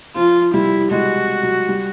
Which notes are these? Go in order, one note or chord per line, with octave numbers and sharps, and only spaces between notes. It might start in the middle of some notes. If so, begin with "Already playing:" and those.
F3 F4
G3 E4
G#3 F#4
F#3
G3